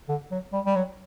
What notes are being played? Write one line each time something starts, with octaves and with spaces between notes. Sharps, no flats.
D3
F#3
G3
G3
F#3